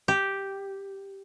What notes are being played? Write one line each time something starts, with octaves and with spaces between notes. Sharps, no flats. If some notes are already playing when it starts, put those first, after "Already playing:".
G4